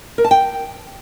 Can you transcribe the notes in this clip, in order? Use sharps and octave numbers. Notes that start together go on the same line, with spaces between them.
A#4
A5
G5